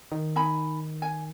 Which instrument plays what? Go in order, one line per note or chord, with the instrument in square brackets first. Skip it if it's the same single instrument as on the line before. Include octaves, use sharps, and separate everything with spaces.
[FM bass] D#3
[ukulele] D#4 G#5 B5
G#5